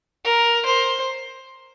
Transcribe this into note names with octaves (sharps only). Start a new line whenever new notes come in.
A#4
C5